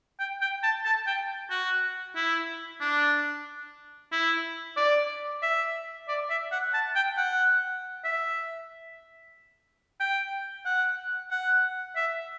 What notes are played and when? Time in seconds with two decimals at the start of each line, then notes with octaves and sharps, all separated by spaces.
0.20 G5
0.42 G5
0.63 A5
0.85 A5
1.07 G5
1.50 F#4
2.16 E4
2.81 D4
4.12 E4
4.77 D5
5.42 E5
6.08 D5
6.30 E5
6.52 F#5
6.74 A5
6.95 G5
7.17 F#5
8.04 E5
10.01 G5
10.65 F#5
11.31 F#5
11.96 E5